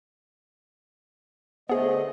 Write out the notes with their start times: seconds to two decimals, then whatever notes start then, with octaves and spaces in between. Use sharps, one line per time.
1.69 D3 A3 B3 G#4 C5 D#5